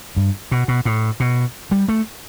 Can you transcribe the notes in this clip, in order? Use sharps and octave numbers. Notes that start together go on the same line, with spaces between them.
G2
B2
B2
A2
B2
G3
A3